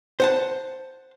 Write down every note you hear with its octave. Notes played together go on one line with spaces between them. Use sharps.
C5 F#5 A5